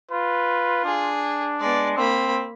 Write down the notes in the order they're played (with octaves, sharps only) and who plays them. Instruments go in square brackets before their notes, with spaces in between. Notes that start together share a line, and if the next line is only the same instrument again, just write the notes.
[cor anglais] F4 [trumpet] B4
[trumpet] D4 [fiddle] G#4
[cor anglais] G#3 [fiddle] B3 D5
[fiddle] A#3 B5 [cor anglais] C4